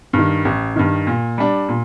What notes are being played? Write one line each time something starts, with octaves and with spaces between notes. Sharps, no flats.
G2 D#3
A1
G2 D#3
A#2
G3 D4
A#2